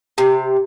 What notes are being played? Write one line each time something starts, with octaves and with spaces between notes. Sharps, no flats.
C3